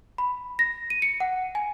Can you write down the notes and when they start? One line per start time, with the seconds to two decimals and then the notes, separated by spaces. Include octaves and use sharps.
0.18 B5
0.59 A#6
0.90 D#7
1.02 C#7
1.20 F#5
1.55 G#5